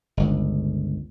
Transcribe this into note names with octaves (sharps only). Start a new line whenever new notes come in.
G1 C#2